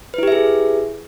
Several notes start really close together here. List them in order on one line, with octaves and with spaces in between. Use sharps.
B4 E4 G4 E5 G#4